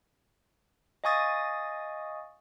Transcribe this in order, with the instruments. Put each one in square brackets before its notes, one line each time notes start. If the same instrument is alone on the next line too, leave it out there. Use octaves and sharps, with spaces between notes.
[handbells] D#5 F5 G#5 C#6 D#6 A6